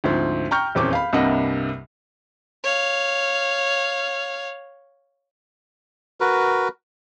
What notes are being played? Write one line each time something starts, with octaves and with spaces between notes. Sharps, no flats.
D2 G#2 F3 C4
G5 A#5 C#6 F6 G6
D#1 E2 C4 C#4 D6
F5 B5
C2 G2 C3 A#3 D#5 F#5
C#5 F5
F#4 A#4 B4